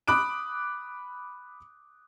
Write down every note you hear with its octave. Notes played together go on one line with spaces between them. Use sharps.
B5 D6 D#6 F#6 D7